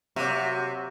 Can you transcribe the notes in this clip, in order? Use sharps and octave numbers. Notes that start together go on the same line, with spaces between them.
C3 F#3 A#3 F#4